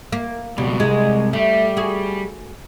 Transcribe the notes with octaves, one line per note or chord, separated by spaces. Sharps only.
A#3
C#2 B2 G3
C2 G#3
G3 A3
F#4 G#4